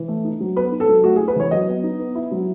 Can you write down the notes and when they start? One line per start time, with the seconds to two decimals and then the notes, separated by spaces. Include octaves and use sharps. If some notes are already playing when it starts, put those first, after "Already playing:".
Already playing: E3
0.08 A3
0.24 D#4
0.40 F#3
0.56 B3 B4
0.72 D#4
0.80 A4
0.88 F#3
1.04 A3 F#4
1.16 G#4
1.20 E4
1.28 B4
1.36 E3 C#5
1.51 F#3 D#5
1.68 B3
1.84 D#4
1.99 B3
2.15 E4
2.31 F#3